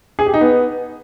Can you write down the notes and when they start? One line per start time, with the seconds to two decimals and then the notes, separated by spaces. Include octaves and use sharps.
0.19 G#4
0.26 G4
0.34 D#4
0.41 B3